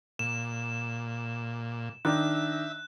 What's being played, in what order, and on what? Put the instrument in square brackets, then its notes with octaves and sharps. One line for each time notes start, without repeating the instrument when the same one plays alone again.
[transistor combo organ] A#2 [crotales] E7
[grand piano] D#3 D4 [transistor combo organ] E5 [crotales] F#6